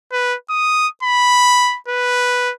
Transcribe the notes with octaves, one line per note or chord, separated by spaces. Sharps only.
B4
D#6
B5
B4